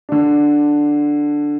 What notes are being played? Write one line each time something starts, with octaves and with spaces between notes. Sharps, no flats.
D3 D4